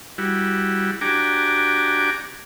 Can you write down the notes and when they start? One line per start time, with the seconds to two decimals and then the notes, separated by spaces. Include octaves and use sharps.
0.18 G3 E4 F#4
1.01 D4 F#4 G4 G#5 A#5 D6